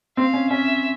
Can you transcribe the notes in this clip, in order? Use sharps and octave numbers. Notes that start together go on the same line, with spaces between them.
C4 F5
C#4
C#4 E5